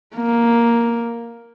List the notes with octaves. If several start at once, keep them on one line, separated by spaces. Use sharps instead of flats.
A#3